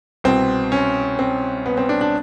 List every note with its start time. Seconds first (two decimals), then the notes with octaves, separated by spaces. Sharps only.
0.24 C2 B2 C4
0.72 C#4
1.19 C4
1.66 B3
1.78 C4
1.89 D4
2.01 D4